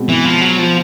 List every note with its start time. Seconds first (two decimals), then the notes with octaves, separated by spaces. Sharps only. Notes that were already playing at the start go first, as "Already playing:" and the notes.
Already playing: B2 G#3 C4
0.09 E3
0.25 F3
0.41 F#3
0.59 F3